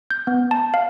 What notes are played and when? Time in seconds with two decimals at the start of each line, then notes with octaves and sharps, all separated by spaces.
0.11 G6
0.27 B3
0.51 A5
0.74 F5